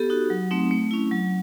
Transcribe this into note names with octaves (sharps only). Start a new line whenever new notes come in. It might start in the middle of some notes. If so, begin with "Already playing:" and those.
Already playing: B3 G4 A4
D#4 F#4
F#3
A3 C4 D#4
A3
C#4 E4
F#3